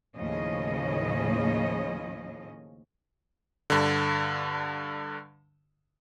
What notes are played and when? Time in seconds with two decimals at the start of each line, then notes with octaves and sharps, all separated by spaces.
0.17 D#2 A2 C#3 F3 C#4 D#5
3.70 G2 D3